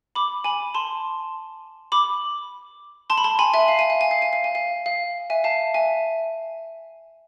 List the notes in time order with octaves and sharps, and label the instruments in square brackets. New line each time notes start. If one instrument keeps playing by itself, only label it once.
[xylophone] B5 D6
G#5 B5
A5 C6
B5 D6
A5 C6
B5
A5 C6
G#5 B5
E5 G#5
F5
G#5
F5
G#5
F5
G#5
F5
G#5
F5
F5
E5 G#5
F5 A5
E5 G#5